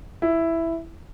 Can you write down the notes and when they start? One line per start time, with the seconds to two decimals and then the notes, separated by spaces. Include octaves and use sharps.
0.22 E4